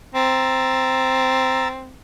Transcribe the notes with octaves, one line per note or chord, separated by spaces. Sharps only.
C4 A#5 E6 A6